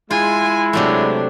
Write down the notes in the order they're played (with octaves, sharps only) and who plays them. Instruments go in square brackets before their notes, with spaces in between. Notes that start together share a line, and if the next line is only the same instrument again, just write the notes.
[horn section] G#3 E4 [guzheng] F4 [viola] G#5
[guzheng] C3 F#3 A3 [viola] D4